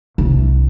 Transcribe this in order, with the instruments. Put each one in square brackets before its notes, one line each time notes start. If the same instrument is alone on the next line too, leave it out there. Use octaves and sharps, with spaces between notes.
[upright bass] C2